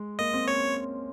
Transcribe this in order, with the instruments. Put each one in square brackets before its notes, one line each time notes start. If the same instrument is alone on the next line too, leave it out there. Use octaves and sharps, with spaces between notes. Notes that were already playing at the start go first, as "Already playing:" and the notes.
Already playing: [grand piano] G#3
[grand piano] A#3 [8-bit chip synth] D#5
[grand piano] C4
[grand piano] C#4 [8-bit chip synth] C#5